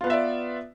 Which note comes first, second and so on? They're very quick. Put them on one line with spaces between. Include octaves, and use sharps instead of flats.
F4 B3 B4 E5 D5